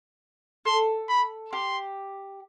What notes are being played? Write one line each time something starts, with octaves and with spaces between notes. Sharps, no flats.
A4 C6
B5
G4 C6